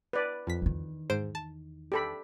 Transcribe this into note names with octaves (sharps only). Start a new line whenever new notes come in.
B4 D5
F2 B6
E2 D#3
G#2 C5 D7
A5
G4 A4 B5